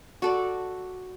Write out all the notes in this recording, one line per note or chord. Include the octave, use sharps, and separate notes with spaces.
F#4 A4 D5